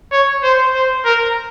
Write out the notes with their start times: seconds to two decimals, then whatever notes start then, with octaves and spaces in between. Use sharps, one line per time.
0.12 C#5
0.43 C5
0.74 C5
1.05 A#4